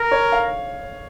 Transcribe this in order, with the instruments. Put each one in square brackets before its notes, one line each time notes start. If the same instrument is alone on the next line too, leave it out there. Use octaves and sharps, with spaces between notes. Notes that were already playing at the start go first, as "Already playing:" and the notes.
Already playing: [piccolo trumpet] A#4
[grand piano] C#5
F5